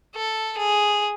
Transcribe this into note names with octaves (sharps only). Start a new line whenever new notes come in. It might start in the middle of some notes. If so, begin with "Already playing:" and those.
A4
G#4